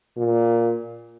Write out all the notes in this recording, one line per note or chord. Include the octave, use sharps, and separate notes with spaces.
A#2